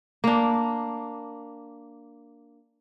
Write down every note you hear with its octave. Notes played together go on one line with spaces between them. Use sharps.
A#3 D4